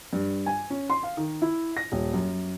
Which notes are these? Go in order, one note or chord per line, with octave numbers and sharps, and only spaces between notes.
G2
G#5
C#4
C6
F5
D#3
E4
A#6
D#1
F#2